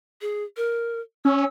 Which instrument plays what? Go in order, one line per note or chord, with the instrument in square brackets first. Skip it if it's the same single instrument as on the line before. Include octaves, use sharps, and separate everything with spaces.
[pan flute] G#4
A#4
[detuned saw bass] C#4 [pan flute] E6